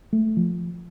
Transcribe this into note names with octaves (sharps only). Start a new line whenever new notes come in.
A3
F3